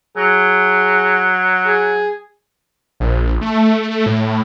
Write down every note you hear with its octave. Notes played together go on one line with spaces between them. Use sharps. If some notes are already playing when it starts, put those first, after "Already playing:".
F#3 G#4
G#4
A#1
A3
A2